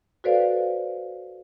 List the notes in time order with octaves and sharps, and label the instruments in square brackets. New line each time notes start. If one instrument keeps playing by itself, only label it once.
[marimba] F#4 A4 B4 C5 D5 F5